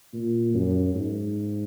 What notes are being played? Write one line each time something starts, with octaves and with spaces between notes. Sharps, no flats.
A#2
F#2
G#2